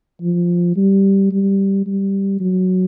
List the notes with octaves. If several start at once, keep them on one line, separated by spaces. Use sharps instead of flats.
F3
G3
G3
G3
F#3